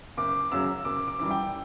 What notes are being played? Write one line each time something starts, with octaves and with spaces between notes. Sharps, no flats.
F#1 D6
F#2 C#3 F#3 E6
F#1 D6
D6
F#2 E3 G3
G5